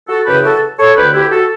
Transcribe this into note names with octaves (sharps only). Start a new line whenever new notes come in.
F#4 A4
F#2 C#3 E3 G4 B4
F#4 A4
A4 C#5
D2 D3 G4 B4
E4 G4
F#4 A4